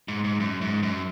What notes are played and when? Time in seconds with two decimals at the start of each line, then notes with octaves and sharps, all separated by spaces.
0.08 G#2
0.24 G#2
0.40 F#2
0.61 G#2
0.82 F#2